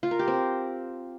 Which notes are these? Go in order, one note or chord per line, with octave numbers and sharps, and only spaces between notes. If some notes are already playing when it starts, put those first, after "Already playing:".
F4
A#4
G4
C4